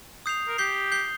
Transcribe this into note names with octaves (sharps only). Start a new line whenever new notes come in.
D#6 G6 C7 F7
A#4
G4 G6 C7 G7
G6 C7 G7